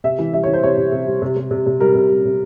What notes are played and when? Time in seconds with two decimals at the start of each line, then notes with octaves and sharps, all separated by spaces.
0.04 C3 E5
0.19 E3
0.33 G3 E5
0.43 E3 C#5
0.53 C5
0.63 C3 C#5
0.77 C3
0.92 C3
1.06 G3
1.22 C3
1.37 C3
1.51 C3
1.66 C3
1.80 G3 A#4
1.95 C3
2.10 G3
2.25 C3